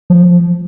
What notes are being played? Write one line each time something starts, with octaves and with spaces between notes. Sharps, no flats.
F3